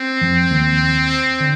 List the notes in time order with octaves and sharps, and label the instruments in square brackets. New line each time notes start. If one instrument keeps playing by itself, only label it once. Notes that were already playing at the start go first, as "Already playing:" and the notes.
Already playing: [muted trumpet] C4
[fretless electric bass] F2 F3
D#2 D#3
D3